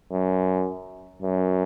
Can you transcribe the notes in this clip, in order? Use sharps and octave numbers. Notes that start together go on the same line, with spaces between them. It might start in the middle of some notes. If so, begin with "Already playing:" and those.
F#2
F#2